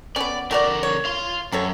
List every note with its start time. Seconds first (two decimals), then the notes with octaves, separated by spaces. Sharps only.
0.16 B3 C#4 D5
0.51 D3 A3 F#4 A#4 D5
0.83 C#5
1.05 F5 C6
1.52 F#2 F#3 A4 C#5